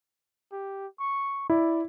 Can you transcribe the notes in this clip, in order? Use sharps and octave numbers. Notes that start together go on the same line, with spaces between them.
G4
C#6
E4 D5